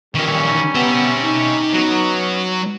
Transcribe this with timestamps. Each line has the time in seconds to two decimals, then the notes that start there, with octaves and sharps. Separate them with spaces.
0.15 A#2 D#3 E3 G3 C#4
0.75 B3 G4 E5
1.24 D#4
1.74 F#3 B3 C#4